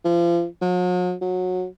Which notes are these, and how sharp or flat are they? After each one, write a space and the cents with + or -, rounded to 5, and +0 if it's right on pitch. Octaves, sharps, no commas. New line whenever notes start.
F3 -35
F#3 -45
F#3 -20